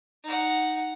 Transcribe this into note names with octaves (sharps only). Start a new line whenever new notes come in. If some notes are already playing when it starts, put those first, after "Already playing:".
D#4 F#5